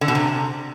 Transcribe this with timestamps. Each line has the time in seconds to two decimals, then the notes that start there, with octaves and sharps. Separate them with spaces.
0.01 D3
0.08 B2
0.15 C3